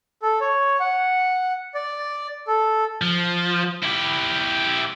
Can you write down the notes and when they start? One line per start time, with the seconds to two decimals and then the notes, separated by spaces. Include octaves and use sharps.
0.22 A4
0.41 C#5
0.80 F#5
1.75 D5
2.48 A4
3.02 F3
3.83 E4 G4